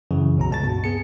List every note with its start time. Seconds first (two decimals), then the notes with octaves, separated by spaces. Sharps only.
0.11 F#2 C#3 E3
0.38 C2 B2 A#5
0.51 C#2 A5 A6
0.64 G2 B2
0.84 B3 G#4 C#7